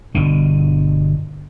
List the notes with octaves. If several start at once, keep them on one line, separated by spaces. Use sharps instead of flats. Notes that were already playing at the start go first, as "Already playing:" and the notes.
G1 B2 D3